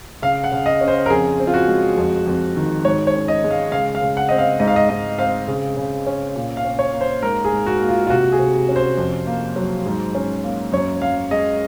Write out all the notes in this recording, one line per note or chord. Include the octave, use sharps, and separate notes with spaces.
C#3 F5
F#5
C#3
D#5
C#4
C5
A#4
F2 G#4
C4
F4
F#4
G#3
F2
F2
D#3
G#2 C#5
C#5
C#4
D#5
G#3
F5
C#3 F5
F5
C#3
F#5
C4 D#5
F5
G#2 D#5
F5
D#5
G#2 D#5
C4 F5
C#3
C#3
C#4
A#2
F5
C#4
C#5
A#3
C5
G#2 A#4
G#4
G#2
F#4
A#3
F4
F4
C3 F#4
G#4
C3
C#4
C5
F2
A#3
F#3
G#2
C#4
A#3
F#2 C#5
F#2 F5
G#3 D#5